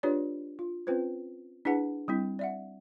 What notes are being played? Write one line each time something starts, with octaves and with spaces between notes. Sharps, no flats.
D4 F4 G4 B4 C#5 D5
F4
C4 C#4 F4 B4 C5
D4 E4 G#4 B4 F#5 A5
G3 C4 E4
D5 E5 F#5